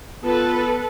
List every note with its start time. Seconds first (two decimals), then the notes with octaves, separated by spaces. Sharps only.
0.24 B3 F4 A4 B4